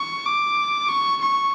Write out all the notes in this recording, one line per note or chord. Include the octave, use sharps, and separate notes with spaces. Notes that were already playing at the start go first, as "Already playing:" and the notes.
Already playing: C#6
D6
C#6
C#6